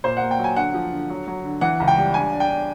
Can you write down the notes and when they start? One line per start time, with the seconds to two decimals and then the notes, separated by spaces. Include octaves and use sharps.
0.04 A#2 C5
0.17 A#3 F#5
0.31 G5
0.39 F#3
0.44 G#5
0.56 D3 F#5
0.74 F3
0.92 D3
1.10 F#3
1.27 F#3
1.44 D3
1.61 E3 F#5
1.80 C#2
1.88 G5
1.98 G3
2.14 D4 G#5
2.32 D4
2.40 G5
2.49 D4